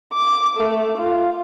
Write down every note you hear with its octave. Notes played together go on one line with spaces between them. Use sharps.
D6
A3
F4